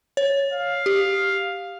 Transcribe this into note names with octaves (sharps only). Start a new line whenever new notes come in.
C#5
F5
G4